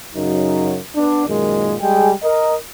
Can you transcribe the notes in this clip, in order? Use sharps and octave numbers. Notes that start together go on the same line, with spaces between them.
F#2 C#3 F#3 D#4
B3 D4
F#2 A#2 D#3 G#3
G3 G#3 G#4 G5
A#4 D#5